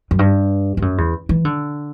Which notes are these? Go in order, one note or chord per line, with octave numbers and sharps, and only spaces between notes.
F#2
G2
G2
F#2
E2
E3
D3